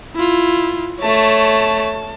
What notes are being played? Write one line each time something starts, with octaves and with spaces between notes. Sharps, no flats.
E4 F4
A3 C#5 A5